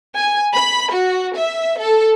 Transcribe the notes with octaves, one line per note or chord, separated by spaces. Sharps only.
G#5
B5
F#4
E5
A4